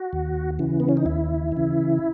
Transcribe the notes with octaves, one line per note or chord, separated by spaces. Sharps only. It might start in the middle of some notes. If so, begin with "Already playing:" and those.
Already playing: F#4
D#2
C#3 E3
B3
C#4
D#4
D#2 E4
C#3 E3